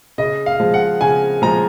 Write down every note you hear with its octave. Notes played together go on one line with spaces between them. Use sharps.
C#3 D#5
F5
F3 G#3
F#5
C#3 G#5
F3 G#3 A#5